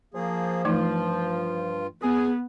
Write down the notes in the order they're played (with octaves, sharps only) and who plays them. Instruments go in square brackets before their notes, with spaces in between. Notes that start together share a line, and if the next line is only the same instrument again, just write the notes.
[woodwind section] F3 [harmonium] A#3 G#4
[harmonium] G2 F4 [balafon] E3 A3 D#4
[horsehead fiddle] B3 [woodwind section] G#4